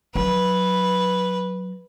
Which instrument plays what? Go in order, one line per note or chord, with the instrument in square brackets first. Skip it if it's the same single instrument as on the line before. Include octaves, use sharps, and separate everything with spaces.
[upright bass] F#3 [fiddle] B4